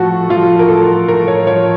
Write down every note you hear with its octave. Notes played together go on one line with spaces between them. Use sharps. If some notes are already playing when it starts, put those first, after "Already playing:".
Already playing: A2 F3 F#4 A4
F3 F4
A#4
A2 A4
A2 A#4
C#5
F3 C#5